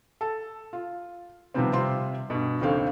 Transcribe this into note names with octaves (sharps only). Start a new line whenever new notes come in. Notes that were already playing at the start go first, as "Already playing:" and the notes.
A4
F4
C3 D#3 F3 G3 B3 C4
C3 G3 C4 F4 C6
G2 B2
F#1 D#2 D3 C4 F5